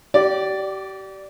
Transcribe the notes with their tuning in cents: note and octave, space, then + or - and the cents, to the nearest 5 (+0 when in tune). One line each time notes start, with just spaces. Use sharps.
G4 -35 D5 +0